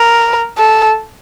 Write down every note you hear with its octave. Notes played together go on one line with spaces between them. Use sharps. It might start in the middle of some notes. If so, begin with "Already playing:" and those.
Already playing: A#4
A4